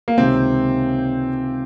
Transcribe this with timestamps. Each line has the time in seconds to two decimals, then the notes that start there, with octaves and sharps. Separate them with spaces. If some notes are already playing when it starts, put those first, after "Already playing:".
0.08 A#3
0.18 C#2 C3 D#3 C4